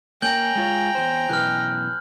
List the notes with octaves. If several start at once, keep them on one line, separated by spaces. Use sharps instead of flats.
A#3 C#4 G5 A#5 G6 F#7 G7
G#3 F4 C#5
E2 C5
F#2 B2 E3 B4 C#5 F6 F#6